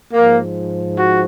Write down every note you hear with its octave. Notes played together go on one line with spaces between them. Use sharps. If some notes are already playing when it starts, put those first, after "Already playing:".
G#2 F3 A#3
F#4